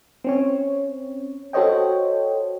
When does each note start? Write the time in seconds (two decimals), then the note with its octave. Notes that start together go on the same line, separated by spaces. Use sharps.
0.24 C4 C#4 C#5
1.53 F#4 A4 C5 C#5 D#5 G5